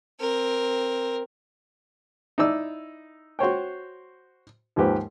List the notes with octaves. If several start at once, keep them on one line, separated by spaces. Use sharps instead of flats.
C4 A#4
D#4 E4 D5 E6
F#4 C5 C#5 G5
D#2 G#2 F3 G4 B4